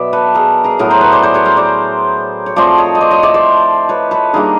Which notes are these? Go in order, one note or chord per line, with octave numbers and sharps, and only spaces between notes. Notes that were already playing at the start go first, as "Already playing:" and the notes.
Already playing: B2 F#3 B3 D5 E5
A4 B4
G#4 A#4
G#4 A#4
A2 F#3 B3 G#4 A#4
A#4 C5
B4 C#5
C5 D5
C5 D5
B4 C#5
A#4 C5
C5 D5
C#5
F3 A3 C4 C5 D5
C#5 D#5
D#5
C5 D5
C#5 D#5
D5 E5
C5 D5
B4 C#5
A4 B4
D#3 G3 A#3 D4 G#4 A#4